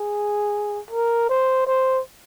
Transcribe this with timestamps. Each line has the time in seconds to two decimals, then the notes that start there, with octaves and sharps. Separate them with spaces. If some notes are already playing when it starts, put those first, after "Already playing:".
Already playing: G#4
0.91 A#4
1.29 C5
1.67 C5